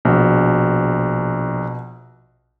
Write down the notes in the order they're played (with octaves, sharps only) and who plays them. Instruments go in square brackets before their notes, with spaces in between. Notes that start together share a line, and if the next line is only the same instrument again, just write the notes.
[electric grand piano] A#1 [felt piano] B2